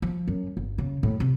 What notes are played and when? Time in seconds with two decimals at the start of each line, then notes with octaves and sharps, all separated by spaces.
0.02 F3
0.28 F#2
0.57 G1
0.78 C#3
1.03 A2
1.20 C3